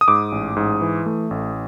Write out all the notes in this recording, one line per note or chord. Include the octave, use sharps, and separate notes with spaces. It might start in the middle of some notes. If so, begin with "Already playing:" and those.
D#6
G#2 D6
A1
G#2
E3
A3
A1